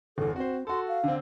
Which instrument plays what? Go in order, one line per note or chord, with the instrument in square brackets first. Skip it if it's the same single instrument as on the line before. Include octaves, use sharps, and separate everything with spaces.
[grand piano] G1 E2 [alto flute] A4
[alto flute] C4 [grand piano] F#4 C5
[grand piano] F#4 A4 [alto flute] C6
[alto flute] F5
[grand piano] D3 C4